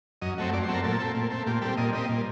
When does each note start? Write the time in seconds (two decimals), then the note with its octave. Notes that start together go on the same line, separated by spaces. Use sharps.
0.22 F#2 D#5
0.38 F#3 A3 C4
0.53 F#2 D5
0.63 C5
0.68 F#3 A3 C4
0.74 A#4
0.83 A#2 A4
1.00 A3 C4
1.15 A#2
1.30 A3 C4
1.47 A#2 G4
1.62 G3 A4
1.65 C4
1.77 A#2 D#5
1.93 G3 C4 D#5
2.09 A#2